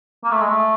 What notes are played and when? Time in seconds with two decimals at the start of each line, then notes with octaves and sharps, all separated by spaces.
0.24 A#3
0.32 A3
0.41 G#3
0.50 A3